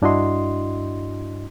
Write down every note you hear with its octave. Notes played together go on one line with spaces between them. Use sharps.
G2 D4 E4 F#4 D#5 C6